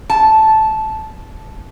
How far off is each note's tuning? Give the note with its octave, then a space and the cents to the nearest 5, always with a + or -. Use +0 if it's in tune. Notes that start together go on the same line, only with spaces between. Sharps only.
A5 -10